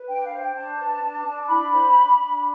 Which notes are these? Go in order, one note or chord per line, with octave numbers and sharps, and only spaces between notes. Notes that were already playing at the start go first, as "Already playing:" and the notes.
Already playing: B4
D4 G5
F5
C5
G5
D4 A5
B4
D4
D4
A5
E4 B5
C5
D4
D4